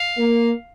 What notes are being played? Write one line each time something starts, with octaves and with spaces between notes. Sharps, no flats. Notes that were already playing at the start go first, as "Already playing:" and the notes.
Already playing: F5
A#3